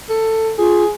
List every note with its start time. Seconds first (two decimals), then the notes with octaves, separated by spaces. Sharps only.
0.09 A4
0.58 F4 G#4